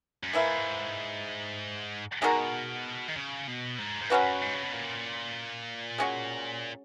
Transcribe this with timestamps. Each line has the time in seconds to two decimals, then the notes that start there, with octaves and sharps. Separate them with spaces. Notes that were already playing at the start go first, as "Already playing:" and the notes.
0.24 F#2
0.33 G#2 E3 A#3 E4
2.22 B2 G#3 D#4 F#4 A#4
3.08 D#3
3.16 C#3
3.48 B2
3.79 G#2
4.02 G#2
4.10 F#2 F#3 C#4 F#4 B4
4.42 G#2
4.55 C#3
4.63 B2
4.73 A#2
5.98 G#3 C#4 F#4